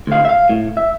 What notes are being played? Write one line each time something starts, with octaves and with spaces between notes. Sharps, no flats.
D2 F5
E5 F5
A2
E5